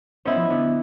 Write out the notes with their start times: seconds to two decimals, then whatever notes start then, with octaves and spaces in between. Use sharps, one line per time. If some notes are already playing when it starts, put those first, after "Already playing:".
0.25 B3 C#4 D#4 E4 C5
0.37 F3
0.49 D2 D3 B3